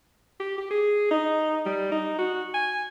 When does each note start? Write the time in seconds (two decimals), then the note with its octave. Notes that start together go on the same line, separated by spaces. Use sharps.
0.40 G4
0.58 G4
0.71 G#4
1.11 D#4
1.66 G3
1.92 D#4
2.18 F#4
2.54 G#5